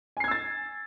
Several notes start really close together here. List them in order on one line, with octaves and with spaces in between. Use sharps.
G#5 C7 G#6 E6 A6